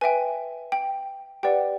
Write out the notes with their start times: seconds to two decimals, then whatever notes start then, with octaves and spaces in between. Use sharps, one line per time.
0.01 B4 E5 G5 G#5
0.72 G5
1.43 G4 B4 D5 F#5 G5